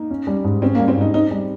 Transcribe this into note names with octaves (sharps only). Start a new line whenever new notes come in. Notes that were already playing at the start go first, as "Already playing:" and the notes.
Already playing: A#3 D#4
C#4
G3
G#2
C4 C#4
A#3
G3
C4
G#2 D#4
C4 D#4
G3